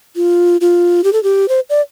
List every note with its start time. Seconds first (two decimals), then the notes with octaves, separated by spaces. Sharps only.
0.16 F4
0.61 F4
1.04 G4
1.13 A4
1.23 G4
1.49 C5
1.70 D5